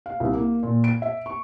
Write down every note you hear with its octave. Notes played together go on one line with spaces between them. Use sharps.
F5
C2
A#3
A#2
D7
E5
C#6